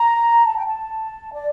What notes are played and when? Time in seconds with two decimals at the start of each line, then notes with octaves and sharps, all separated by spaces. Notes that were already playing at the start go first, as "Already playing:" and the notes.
Already playing: A#5
0.45 A5
0.56 G5
0.66 A5
1.33 D5